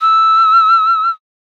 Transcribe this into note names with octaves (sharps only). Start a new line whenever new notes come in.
E6